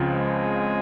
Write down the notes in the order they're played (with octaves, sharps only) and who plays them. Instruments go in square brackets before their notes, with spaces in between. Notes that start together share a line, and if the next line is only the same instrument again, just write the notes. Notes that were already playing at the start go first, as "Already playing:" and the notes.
Already playing: [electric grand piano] C#2 C#3 F3 C4 F4
[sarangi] G#3